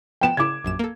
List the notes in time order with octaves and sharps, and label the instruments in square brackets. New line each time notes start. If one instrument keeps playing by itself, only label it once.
[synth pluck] F3 B3 A5 [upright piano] G5 E7
[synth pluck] C#3 E4 [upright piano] D6 G#6
[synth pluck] A#1 F#2 E7
A#3 A4